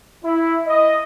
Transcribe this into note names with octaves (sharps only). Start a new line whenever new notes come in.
E4
D#5